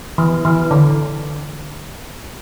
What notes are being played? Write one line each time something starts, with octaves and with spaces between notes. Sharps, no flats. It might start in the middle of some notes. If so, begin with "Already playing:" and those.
E3
E3
D3